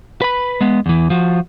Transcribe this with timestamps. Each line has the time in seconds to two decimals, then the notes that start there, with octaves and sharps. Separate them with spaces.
0.22 B4 B5
0.61 G#3 B3
0.86 E2 E3
1.10 F3 F#4